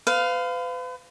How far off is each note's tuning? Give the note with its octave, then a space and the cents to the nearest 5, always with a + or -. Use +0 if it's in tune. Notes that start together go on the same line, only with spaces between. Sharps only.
B4 +40 F5 +0